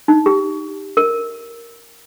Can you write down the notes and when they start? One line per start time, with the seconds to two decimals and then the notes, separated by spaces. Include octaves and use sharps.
0.08 D#4
0.26 G4
0.97 A#4